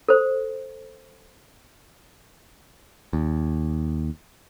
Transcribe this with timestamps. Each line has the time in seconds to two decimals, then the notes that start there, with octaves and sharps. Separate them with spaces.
0.08 A4 C5
3.13 D#2